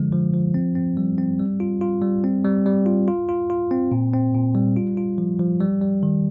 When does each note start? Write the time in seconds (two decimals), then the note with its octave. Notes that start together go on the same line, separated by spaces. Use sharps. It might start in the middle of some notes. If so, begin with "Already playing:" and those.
Already playing: D3 F3 G#3
0.13 F3
0.34 F3
0.54 C4
0.75 C4
0.97 G3
1.18 C4
1.39 G3
1.60 F4
1.81 F4
2.02 G3
2.24 C4
2.45 G3
2.66 G3
2.86 F4
3.08 F4
3.29 F4
3.50 F4
3.71 C4
3.92 A#2
4.13 C4
4.34 A#2
4.55 G3
4.76 F4
4.97 F4
5.18 F3
5.39 F3
5.61 G3
5.81 G3
6.03 D#3